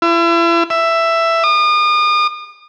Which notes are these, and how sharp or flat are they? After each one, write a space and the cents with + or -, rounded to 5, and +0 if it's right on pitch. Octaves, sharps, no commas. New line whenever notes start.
E4 +40
E5 +10
D#6 -40